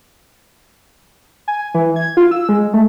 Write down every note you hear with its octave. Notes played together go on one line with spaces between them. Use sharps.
G#5
E3
G#6
F4
E6
G#3
A3